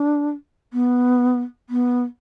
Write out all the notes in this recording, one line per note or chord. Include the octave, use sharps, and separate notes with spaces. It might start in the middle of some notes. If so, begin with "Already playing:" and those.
Already playing: D4
B3
B3